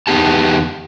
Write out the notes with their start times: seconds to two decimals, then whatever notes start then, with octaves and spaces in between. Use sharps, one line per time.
0.07 E2 A#2 B3 D#4 G4 A5